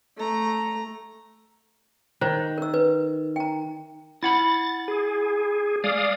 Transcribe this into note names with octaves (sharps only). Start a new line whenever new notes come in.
A3 A#5
D#3 C5
A#4 E6
B4
G5 A#5
E4 F#5 B5 A6
G#4
G#3 D5 F5 D#6